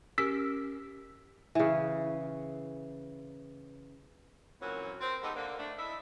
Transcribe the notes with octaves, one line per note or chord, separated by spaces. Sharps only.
C#4 G4 A#4 E6 B6
C#3 E3
A#2 E3 F#3 A#3 C4 C#4
C4 A#4
G#3 B3 D#4 G4 A4
D3 A#3
A3 D4
E4 A4 D#5 E5